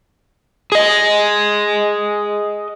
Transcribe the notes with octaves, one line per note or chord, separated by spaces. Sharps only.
G#4 D#5